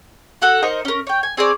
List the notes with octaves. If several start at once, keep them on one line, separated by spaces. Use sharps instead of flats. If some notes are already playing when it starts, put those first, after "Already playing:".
F#4 A4 F#5
D#4 A#4 C5 D#5
C#4 A#4
C#5 G5
G#5
C4 G#4 C#5 D5